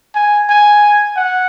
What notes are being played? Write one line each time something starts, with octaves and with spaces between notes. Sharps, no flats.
G#5
G#5
F#5